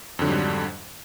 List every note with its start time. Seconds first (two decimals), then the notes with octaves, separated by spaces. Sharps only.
0.19 F2
0.22 D3
0.24 F#3
0.27 G#2
0.30 G3